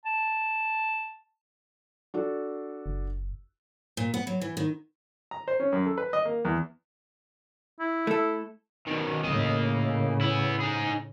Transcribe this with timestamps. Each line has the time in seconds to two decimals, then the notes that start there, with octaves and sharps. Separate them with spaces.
0.05 A5
2.14 D4 F#4 A4
2.86 F#1
3.97 A#2
4.14 B3
4.27 F#3
4.41 E3
4.57 D#3
5.31 A#5
5.48 C5
5.60 C#4
5.72 F#2
5.86 A4
5.98 B4
6.13 D#5
6.25 A#3
6.45 E2
7.80 E4
8.07 A3 A4
8.87 B2 D#3
9.24 A2 C#3 A#3 D#5
10.21 B3 E4
10.61 D#4 G#4